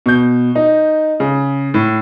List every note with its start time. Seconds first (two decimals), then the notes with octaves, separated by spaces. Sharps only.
0.06 B2 G6
0.55 D#4
1.20 C#3
1.74 A2